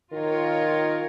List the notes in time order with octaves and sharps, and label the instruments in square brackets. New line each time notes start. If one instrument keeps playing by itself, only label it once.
[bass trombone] D#3 [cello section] F4 A#4 C#5